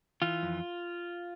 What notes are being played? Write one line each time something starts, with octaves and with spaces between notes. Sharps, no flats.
E3 F4
F2